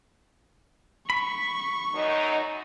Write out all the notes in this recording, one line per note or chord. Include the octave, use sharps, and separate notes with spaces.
B5 C#6
F#2 D#4